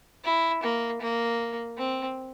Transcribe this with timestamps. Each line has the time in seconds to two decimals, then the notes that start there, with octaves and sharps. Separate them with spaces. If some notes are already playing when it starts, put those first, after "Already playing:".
0.24 E4
0.63 A#3
1.02 A#3
1.77 C4